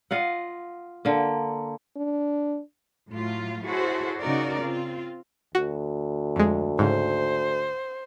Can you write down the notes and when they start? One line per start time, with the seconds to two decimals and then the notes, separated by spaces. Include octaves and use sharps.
0.11 F4 D#5 F5 F#5
1.05 D3 A#3
1.97 D4
3.10 A2 F#3 A3 F4
3.66 E4 F#4 G#4 A4 C5 C#5
4.21 C#3 D#4 F#4 A#4 D5
4.61 C4 F4
5.55 D2 F#4
6.36 F2 G#3
6.79 G#2 C#3 C5